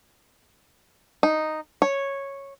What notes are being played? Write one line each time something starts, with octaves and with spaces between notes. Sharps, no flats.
D#4
C#5